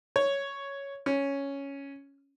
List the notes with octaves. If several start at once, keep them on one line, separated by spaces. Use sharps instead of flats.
C#5
C#4